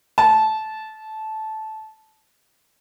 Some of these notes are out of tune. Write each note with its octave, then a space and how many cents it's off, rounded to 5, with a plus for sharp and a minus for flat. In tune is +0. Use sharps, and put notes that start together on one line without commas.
A5 -15